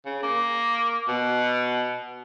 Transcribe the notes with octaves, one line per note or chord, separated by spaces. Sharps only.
C#3
A#3
B2